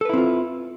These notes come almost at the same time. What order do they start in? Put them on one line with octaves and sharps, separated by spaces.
A4 B4 E4 C4 F4